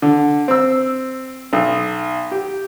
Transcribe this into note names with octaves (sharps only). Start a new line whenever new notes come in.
D3
C4 E6
B1
G4